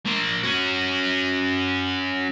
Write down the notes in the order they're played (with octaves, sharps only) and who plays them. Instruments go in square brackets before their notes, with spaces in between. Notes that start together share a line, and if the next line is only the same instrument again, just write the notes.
[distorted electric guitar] A#3 C5
C#4 F#4